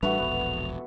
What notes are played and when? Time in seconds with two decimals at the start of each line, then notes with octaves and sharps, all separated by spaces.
0.03 A1 G3 A3 D4 F#4 B4 F7
0.18 E1 A#1 B3